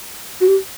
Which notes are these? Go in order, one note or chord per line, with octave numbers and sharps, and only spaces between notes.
F#4
G4